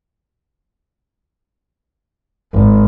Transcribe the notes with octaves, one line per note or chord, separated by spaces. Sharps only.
G#1